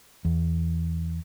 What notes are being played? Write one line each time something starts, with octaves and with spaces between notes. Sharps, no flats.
E2